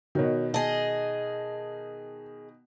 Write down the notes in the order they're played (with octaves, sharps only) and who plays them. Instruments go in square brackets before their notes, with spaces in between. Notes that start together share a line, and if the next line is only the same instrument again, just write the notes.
[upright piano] B2 D#3 [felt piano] F#4 C#5
[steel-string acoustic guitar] G#4 D#5 [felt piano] A5